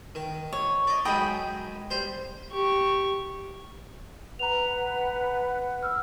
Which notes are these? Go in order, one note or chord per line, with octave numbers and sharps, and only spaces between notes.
D#3
C#5
D5 D#5
F#2 G#3 D#4 G5 B5 D#6
G3 C5
G4 C#6
B4 F#5 A#5 F7
E6 F6